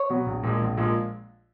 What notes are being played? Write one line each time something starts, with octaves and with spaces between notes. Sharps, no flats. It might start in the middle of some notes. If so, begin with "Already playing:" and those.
Already playing: C#5
B2 F#3 B3
A#1
A#2 F3 G#3
A#1
A#2 F3 G#3